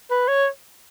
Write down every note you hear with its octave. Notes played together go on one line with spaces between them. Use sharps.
B4
C#5